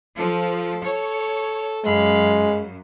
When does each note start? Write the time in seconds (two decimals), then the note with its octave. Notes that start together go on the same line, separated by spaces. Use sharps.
0.16 F3 A4
0.84 A4 C#5
1.85 F#2 G#3 F5 B5